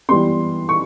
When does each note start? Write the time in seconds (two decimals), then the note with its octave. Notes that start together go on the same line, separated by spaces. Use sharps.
0.09 E3 G3 B3 C6
0.69 C#6